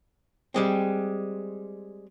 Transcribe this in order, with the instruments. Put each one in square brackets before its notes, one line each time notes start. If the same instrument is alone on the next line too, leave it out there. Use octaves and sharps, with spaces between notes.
[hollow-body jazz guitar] G3 G#3 C4